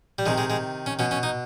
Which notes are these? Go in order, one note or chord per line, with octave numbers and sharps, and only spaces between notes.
G3
C3 D#3 G#3
G#3
G#3
C#4
B2 C#4
C#4
D#4